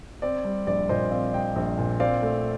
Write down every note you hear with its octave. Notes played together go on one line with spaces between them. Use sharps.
C4 D5
G3
A#1 D5
A#2 C5 D#5
C4 D5 F5
G3 D#5 G5
A#1
A#2
C4 D5 F5
A3